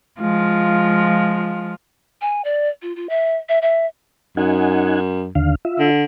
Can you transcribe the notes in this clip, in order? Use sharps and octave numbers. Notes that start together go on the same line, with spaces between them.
F3 G#3 F4
G#5
D5
F4
F4
E5
E5
E5
F#2 D#4 F#5 G#5
D#2 D3 F5
F4 E5
D3